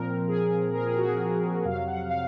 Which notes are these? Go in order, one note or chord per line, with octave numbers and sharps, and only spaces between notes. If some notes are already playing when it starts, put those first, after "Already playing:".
Already playing: A#2 F3 C4 A#4
G#4
A#4
G#4
F#4
G#4
F2 C3 F#3 F5
F#5
F5